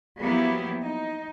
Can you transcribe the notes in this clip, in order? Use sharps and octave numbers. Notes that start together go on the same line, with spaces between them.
F3 F#3 A#3 B3 E4 G4
D#4